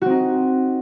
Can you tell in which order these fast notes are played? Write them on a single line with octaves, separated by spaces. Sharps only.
F#4 C4 D#4